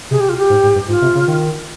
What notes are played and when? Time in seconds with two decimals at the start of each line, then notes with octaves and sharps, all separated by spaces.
0.11 C3 G#4
0.20 G4
0.29 F4
0.37 G4
0.50 G#2
0.63 G#2
0.75 G2
0.88 G#2 F4
1.02 C3
1.15 C#3
1.27 D#3